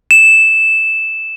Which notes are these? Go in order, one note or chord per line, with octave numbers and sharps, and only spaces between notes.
E7